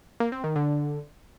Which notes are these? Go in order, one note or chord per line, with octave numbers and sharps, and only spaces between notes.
A#3
C4
D#3
D3